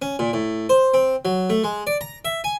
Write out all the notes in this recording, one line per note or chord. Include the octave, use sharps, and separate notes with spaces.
C#4
A#2
A2
C5
C4
F#3
A3
G#3
D5
A#5
E5
G#5